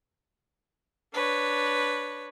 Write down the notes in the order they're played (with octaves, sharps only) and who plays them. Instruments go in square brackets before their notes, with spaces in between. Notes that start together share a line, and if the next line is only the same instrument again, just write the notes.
[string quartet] D4 B4 C#5